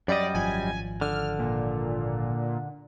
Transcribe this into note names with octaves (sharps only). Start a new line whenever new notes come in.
F#2 G3 D5 D#5
G#1 F3 G#5
D3 F6
A#2